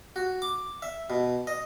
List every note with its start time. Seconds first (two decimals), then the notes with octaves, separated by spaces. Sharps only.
0.16 F#4
0.42 D6
0.82 E5
1.10 B2
1.47 D#5